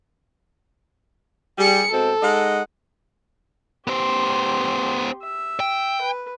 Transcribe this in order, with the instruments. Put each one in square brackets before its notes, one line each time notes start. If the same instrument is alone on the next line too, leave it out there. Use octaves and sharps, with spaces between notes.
[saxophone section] G3 [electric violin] G#4 C#7
[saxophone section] B2 G#3 C4 [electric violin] A4
[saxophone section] G#3 D#4 F#5
[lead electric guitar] B3 C5 [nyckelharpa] G4 C6
[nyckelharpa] E5
[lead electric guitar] G5
[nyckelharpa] B4